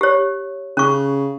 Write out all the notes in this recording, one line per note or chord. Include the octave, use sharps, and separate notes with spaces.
G4 C#5
C#3 C#4 C#6